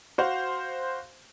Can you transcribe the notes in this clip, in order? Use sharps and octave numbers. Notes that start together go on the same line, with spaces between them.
F#4 C5 F5